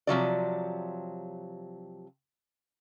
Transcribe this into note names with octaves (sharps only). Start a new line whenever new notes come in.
C3 F3 F#3 D5